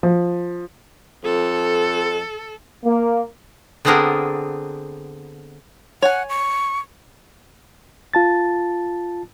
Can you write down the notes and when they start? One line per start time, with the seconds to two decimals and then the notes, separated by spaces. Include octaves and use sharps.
0.03 F3
1.25 F2 A4
2.84 A#3
3.85 D3 B3 C4 D4 G#4 A#4
6.02 C#5 F#5 G#5
6.29 C#6
8.14 F4 A5 A6